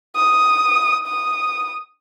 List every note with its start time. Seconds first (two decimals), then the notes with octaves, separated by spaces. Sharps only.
0.15 D#6
1.06 D#6